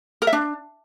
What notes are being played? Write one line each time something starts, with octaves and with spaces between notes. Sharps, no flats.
A#4
E5
D4